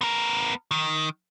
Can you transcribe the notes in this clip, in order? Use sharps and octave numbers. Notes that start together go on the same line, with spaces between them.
B3 A#4
D#3